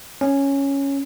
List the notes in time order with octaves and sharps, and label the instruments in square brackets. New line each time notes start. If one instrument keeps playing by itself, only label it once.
[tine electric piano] C#4